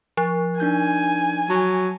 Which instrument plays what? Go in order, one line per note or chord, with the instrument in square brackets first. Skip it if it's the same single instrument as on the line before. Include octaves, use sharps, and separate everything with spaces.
[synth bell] F3
[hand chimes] D4 D#4 G6 [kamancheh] G#5
[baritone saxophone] F#3 [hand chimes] A5